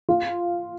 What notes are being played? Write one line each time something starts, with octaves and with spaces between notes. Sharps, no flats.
F4